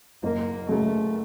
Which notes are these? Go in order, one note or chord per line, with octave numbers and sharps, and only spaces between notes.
F#1 A#3
F#2 C#3 A3